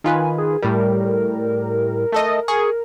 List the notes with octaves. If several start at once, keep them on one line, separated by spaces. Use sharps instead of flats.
D#3 F4 B4 G#5
G#4
A2 G3 A#4
A3 A4 D#5
G#4 A#4 C#6